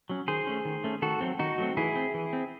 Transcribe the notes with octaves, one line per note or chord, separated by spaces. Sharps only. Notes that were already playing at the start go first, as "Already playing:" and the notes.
F#3 C#4
D#3 G#4 C5
A3 C#4
D#3
A3 C#4
D#3 F#4 A4
F#3 A3 C4
D#3 D#4 F#4
F#3 A3 C4
E3 E4 G#4
C4
E3
C4